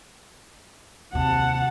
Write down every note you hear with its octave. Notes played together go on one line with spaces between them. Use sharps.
D#2 C3 F#5 A5